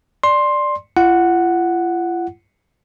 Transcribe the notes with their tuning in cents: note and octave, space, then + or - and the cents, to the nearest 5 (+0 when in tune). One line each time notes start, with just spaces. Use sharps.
D5 +5 C6 +10
F4 -40 F#5 +0